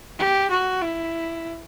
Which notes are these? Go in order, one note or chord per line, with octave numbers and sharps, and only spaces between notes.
G4
F#4
E4